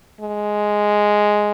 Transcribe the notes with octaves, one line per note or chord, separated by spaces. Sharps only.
G#3